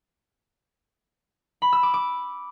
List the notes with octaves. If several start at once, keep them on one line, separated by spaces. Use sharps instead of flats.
B5
E6
D6
D6